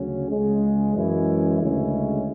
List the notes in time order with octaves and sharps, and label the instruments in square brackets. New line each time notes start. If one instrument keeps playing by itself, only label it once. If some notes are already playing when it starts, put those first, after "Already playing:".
Already playing: [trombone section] D2 C#3 F#3 C#4
C#2 C#3 G#3
F#2 E3 G#3 C#4 E4
D2 C#3 G#3 C#4 E4